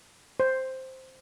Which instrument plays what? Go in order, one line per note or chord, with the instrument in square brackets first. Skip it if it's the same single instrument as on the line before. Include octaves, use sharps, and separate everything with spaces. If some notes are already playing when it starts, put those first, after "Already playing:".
[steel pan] C5